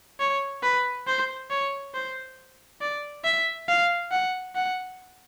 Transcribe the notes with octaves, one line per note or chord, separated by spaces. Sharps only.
C#5
B4
C5
C#5
C5
D5
E5
F5
F#5
F#5